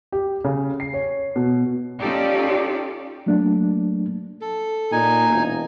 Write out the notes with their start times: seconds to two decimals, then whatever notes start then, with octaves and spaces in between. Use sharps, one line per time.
0.12 G4
0.44 C#3
0.80 C7
0.94 C#5
1.36 B2
2.00 C#4 D#4 F4 G4 A4 D5
3.26 F#3 A3 A#3 D4
4.41 A4
4.92 A#2 D#4 G#5
5.29 E1